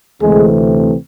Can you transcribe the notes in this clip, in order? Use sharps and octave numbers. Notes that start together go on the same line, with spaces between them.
D2 C3 E3 G#3 A3 C4 G#4